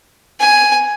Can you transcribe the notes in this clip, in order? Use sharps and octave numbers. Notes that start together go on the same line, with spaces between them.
G#5